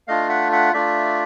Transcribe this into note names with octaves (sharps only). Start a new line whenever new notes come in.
A3 D4 F4 D#5 F5
E5 F#5
E5 F#5
A3 D4 F4 D5 E5